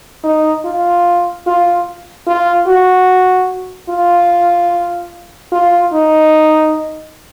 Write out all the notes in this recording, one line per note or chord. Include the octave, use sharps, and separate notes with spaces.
D#4
F4
F4
F4
F#4
F4
F4
D#4